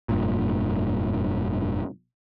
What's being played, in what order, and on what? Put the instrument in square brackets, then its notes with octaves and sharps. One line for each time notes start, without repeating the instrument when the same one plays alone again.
[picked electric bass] F1 G2 A#2